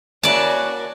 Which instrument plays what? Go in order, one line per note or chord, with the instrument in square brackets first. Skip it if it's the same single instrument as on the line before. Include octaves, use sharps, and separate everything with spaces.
[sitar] A#3 E4 F#4 [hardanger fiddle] C#4 [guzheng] D5 A5